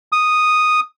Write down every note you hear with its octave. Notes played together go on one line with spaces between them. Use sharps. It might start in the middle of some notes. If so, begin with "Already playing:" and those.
D#6